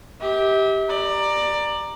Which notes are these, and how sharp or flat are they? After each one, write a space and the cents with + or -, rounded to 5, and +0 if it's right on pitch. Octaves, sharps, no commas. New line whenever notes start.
G4 +0 E5 -45
D5 +15 A#5 +0